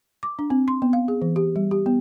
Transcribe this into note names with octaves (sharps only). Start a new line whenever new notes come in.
D6
D4
C4
C6
B3
F5
G#4
E3
G4
G3
G4
B3